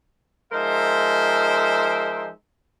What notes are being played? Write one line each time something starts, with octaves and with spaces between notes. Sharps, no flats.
F3 G#3 D#4 A#4 C5 E5